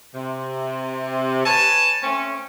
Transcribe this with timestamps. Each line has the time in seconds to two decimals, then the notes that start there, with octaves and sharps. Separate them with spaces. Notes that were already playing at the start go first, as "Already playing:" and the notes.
0.13 C3
1.45 B4 C#5 G#5 A5
2.03 A3 C4 C#4